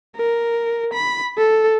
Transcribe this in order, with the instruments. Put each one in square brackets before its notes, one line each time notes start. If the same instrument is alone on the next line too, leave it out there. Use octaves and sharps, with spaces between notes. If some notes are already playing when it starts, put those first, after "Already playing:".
[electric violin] A#4
B5
A4